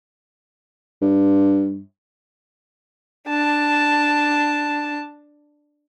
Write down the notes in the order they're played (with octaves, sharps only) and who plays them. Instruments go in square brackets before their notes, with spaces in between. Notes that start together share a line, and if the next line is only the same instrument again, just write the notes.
[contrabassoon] G2
[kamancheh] D4 A5